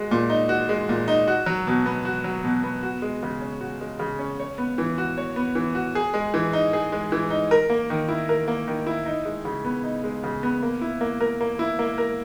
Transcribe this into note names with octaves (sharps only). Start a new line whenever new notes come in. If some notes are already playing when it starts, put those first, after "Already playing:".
Already playing: G#3 F#4
A#2
D#4
F#4
G#3
A#2
D#4
F#4
F#3
B2
B3
F#4
F#3
B2
B3
F#4
G#3
C#3
C#4
F#4
G#3
C#3
C#4
C#5
B3
E3
F#4
C#5
B3
E3
F#4
G#4
G#3
E3
D#4
G#4
G#3
E3
D#4
A#4
A#3
D#3
E4
A#4
A#3
D#3
E4
D#4
G#3
C#3
B3
D#4
G#3
C#3
B3
A#3
E4
A#3
A#4
A#3
E4
A#3
A#4